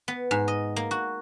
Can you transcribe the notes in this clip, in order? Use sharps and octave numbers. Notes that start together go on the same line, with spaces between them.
B3
G#2
D#5
A#3
F#4